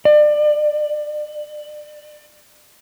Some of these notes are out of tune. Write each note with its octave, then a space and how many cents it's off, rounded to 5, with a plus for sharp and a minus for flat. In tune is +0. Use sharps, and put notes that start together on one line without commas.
D5 +30